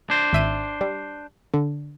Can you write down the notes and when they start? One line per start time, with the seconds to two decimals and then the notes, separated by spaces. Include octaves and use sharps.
0.10 D4 C5
0.33 G#1 E5 D#7
0.81 G3
1.54 D3